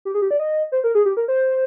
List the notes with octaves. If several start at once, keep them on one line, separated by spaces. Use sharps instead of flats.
G4
G#4
G4
D5
D#5
C5
A#4
G#4
G4
A#4
C5